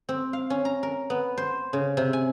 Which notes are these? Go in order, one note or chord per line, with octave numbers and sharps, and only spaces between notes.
C4
F5
C#4
A#5
A#4
B3
C5
C#3
C3
G#5